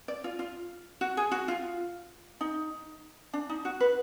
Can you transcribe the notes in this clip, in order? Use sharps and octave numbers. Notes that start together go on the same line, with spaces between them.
D5
F4
F4
F#4
G#4
F#4
F4
D#4
D4
D#4
F#4
B4